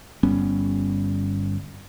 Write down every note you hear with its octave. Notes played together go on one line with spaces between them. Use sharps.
G1 G3 B3 C#4